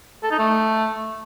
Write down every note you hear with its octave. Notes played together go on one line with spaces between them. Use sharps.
A4
D#4
A3